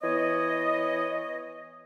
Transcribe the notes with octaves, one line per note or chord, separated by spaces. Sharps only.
E3 B3 C#5 D#5